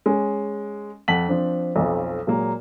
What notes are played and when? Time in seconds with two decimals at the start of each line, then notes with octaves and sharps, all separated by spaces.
0.06 G#3 C#4
1.08 F2 F#5 A5 B6 F#7
1.28 F3 C4 D4
1.76 B1 F2 F3
2.27 A#2 F#3 G#3 A#3